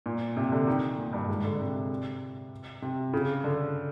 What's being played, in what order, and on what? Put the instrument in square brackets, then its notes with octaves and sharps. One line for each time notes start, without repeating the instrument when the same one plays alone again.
[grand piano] A#2
C3
D3
D#3
A#2
G2
G#2
D3
C3
C3
C#3
D3